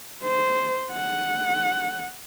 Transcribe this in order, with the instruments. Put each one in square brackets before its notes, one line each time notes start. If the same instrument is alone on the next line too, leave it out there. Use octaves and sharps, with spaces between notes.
[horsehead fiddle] C5
F#5